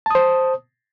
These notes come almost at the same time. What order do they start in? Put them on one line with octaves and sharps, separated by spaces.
A5 D#6 C5